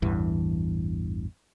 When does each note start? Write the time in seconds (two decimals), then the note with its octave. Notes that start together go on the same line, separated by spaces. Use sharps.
0.02 A1 E2 G2 E3